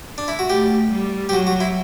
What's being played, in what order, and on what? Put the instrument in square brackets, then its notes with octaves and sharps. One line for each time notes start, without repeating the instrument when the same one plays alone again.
[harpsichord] D4
E4
F#4
[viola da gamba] A3 [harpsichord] G4
[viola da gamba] G3
[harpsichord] G4
[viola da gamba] F#3 [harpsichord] F#4
[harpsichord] F#4
E4